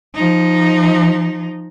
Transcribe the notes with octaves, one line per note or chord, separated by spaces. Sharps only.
F3 D#4